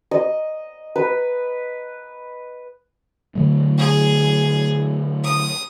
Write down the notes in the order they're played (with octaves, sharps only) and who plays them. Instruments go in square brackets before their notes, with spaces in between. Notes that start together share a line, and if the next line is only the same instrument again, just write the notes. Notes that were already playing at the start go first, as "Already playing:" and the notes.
[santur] D#5
B4
[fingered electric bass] D3 F#3 A3
[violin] G#4
D#6